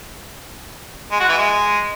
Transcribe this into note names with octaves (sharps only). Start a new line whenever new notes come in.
G#3
F#4
E3
G#3